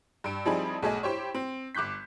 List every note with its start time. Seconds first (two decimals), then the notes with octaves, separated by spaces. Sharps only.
0.24 G2 D7
0.45 F3 G3 C4 D#4 E4 G#4
0.82 B1 A3 G#4 D#5
1.03 E4 G4 C5 C#5
1.35 C4
1.75 G1 D6 F#6 G6 B6